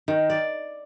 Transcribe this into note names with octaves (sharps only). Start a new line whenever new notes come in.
D#3
D5